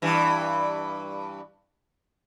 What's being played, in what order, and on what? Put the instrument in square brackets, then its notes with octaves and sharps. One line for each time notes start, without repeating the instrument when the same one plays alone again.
[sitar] G2 E3